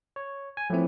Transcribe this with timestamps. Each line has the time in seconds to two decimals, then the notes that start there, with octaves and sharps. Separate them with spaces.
0.16 C#5
0.57 G#5
0.70 A2 E3 F3 C4